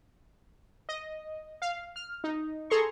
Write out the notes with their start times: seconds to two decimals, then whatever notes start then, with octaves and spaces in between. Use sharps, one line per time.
0.89 D#5
1.62 F5
1.96 F6
2.24 D#4
2.70 G#4 A4 A#5 C6 C#6